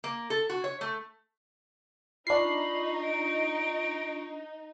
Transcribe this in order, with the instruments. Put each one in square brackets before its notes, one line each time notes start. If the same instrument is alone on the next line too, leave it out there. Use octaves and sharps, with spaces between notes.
[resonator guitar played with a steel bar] A#3
A4
F#4
C#5
A3
[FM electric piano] D4 C7 [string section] D#4 [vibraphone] F4 C#6 [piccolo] B5
[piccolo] D7